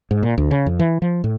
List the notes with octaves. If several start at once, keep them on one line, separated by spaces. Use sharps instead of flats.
G#2
A#2
D2
C#3
F2
E3
F3
A2